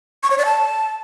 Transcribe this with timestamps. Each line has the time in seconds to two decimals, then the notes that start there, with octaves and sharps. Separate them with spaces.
0.23 C#6
0.30 C#5
0.38 D5
0.45 A5